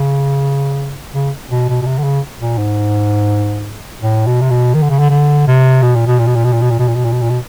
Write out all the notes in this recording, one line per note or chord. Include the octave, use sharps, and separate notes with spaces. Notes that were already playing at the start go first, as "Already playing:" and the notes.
Already playing: C#3
C#3
B2
B2
B2
C3
D3
C#3
A#2
G#2
A2
B2
C3
B2
D#3
D3
C#3
D3
D3
C3
B2
A#2
B2
A#2
B2
A#2
B2
A#2
B2
A#2
B2
A#2
B2
A#2
B2
A#2
B2